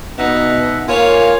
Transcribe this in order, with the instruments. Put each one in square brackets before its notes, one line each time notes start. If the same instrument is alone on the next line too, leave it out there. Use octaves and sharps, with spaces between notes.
[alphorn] B2 [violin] D#4 [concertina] E5 F#5
[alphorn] A#3 [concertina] F4 G#5 [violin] C#5 F5